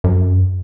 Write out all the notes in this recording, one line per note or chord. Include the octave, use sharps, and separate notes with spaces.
F#2